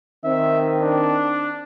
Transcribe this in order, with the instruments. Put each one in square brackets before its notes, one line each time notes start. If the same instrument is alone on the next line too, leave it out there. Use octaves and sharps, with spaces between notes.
[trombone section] D#3 C4 [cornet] E5
[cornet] D4